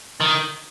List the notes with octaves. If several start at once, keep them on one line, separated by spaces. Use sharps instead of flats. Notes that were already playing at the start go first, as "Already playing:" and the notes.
D#3